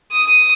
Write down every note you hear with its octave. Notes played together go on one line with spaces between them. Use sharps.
D#6